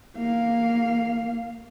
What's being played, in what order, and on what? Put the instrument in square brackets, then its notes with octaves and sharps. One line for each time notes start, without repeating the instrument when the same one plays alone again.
[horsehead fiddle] A#3 F5